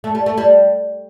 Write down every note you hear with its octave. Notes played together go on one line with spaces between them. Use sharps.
A3
G3
A3
G3